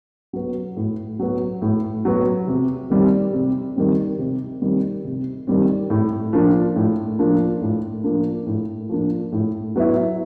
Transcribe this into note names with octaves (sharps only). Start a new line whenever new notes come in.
F#3 B3
A2
F#3 B3
A2
F#3 B3
C3
D#3 G3 C4
C3
D#3 G3 C4
C3
D#3 G3 C4
C3
D#3 G3 C4
A2
F3 A#3 D4
A2
F3 A#3 D4
A2
F3 A#3 D4
A2
F3 A#3 D4
A2
F#3 B3 E4